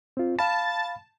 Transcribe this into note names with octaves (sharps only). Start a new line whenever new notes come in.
C4 F4
F5 A5 B5